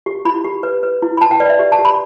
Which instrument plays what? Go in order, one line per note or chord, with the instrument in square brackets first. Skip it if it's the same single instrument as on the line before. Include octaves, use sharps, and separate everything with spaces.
[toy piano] G4
E4 B5
G4
B4
B4
E4
B5
E4 A5
G5
B4 D5
E5
G4
A5
G4
B5